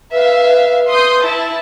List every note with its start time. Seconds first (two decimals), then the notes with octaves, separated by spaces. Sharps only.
0.13 B4 E5 F5
0.90 C6 D#6 G6
1.22 E4 A5